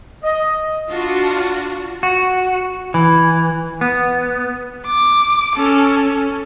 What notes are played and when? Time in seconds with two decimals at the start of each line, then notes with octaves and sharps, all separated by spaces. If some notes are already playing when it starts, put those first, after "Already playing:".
0.24 D#5
0.92 D4 F4 F#4
2.03 F#4
2.94 E3
3.81 B3
4.86 D6
5.56 C#4 A4